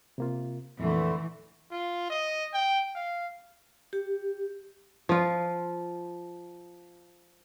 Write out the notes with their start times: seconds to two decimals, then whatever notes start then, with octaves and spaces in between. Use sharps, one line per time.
0.18 C3 A#3 F4
0.79 F2 A#2 D3 E3 A3
1.70 F4
2.10 D#5
2.53 G5
2.95 F5
3.93 G4
5.09 F3 F4